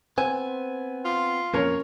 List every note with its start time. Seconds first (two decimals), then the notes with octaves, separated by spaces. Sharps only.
0.18 B3 C4 G#5
1.05 F4
1.54 F2 A#2 C#4 A#4 C#5